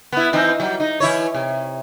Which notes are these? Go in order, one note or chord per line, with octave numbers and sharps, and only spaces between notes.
B3 E4
E3 C4 D#4
F#3 G3
D#4
E3 E4 C#5
C3